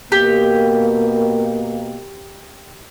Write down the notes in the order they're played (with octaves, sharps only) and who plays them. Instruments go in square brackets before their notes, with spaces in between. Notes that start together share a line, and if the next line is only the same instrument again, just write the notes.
[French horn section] B2 A#3 [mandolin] G4